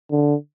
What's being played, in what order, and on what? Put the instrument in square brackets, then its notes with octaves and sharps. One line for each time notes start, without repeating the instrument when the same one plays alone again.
[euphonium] D3